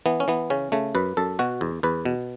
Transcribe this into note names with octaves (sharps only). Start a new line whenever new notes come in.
E3 B3
C#4
E3 B3
C#3 C#4
C#3 A3
F#2 B4
F#2 A4
B2 F#4
E2
E2 B4
B2